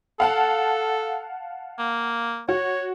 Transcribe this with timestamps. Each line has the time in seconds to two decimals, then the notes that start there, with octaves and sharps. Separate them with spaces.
0.20 A4 F5 F#5 A5
1.79 A#3
2.49 F#4 C#5